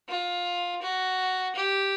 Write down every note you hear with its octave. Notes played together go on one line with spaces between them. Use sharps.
F4
F#4
G4